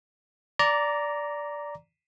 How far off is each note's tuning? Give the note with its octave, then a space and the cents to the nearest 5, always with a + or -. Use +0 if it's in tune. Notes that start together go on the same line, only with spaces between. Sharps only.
D5 -10 A#5 +0 D6 -30